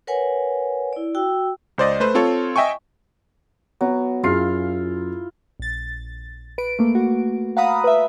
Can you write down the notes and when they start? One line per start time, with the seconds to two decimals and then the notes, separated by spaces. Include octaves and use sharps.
0.07 A#4 B4 C#5 F#5 G#5
0.93 E4 D5
1.15 F#4 G5 E6
1.78 C#2 C5 D5 D#5
2.00 A3 B4 C5
2.15 C4 F4 A4 C#5
2.56 D#5 E5 G5 G#5 C#6
3.81 F#3 B3
4.23 F#2 E4 F4 G#4 F5 C7
5.60 A#1 A6
6.58 B4 D7
6.79 A3 A#3
6.95 F#4
7.57 F5 F#5 A#5 B5 D#6
7.84 B4 E5